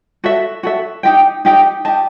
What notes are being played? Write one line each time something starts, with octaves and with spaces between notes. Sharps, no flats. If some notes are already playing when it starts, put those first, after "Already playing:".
F#4 A4 E5
F#4 A4 E5
D#4 G4 D#5 G5
D#4 G4 D#5 G5
G4 D#5 A5